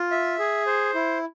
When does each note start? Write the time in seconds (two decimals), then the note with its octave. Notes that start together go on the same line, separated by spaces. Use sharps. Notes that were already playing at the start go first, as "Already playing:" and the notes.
Already playing: F4
0.11 E5
0.39 G#4
0.66 C5
0.95 E4